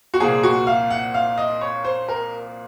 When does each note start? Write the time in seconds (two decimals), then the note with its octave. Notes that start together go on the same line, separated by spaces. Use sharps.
0.14 F#4
0.20 C2 A#2 F3 A#3 G#4
0.43 F#4
0.67 F5
0.90 F#5
1.14 F5
1.38 D#5
1.61 C#5
1.85 C5
2.08 A#4